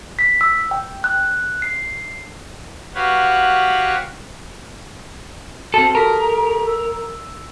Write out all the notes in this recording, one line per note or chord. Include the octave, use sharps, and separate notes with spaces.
B6
E6
G5
F#6
C7
F#4 G4 B4 C#5 F5 F#5
C4 F#4 A4 A5
G4 A4 A#4 B6
E6